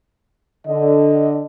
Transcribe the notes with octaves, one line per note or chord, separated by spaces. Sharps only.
D3 D#5